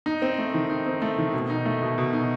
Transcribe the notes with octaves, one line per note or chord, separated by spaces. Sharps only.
D#4
C4
A3
D#3
D#4
C4
A3
D#3
B2
D#4
A3
B2
B2
D#4